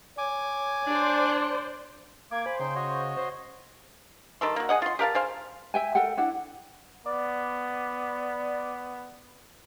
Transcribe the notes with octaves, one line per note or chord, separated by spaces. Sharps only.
C#5 G#5 D6
D4 C5 D5
A#3 D6 G#6
C5 G#5 B5
C#3 D#4 G5 C6
F#4 C#5 D#5
C5
D#3 G3 A4 C6
A#3 F#4
G#4 D#5 F#5
F4 C6
G4 A#4 F5 A5
G#4 C5 F5
E5 G5 G#5
A4 A#4 F#5 G5
D4 E4 F#5
B3 D5